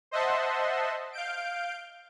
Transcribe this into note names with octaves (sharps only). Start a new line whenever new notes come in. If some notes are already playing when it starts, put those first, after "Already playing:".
C5 D#5 E5 F#5 A5 C6
F5 G6 D7